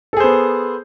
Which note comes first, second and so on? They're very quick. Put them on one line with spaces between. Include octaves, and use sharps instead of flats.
A4 G#4 C5 B3